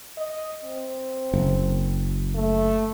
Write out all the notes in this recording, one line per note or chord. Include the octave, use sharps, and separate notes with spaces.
D#5
C4
F#1
A3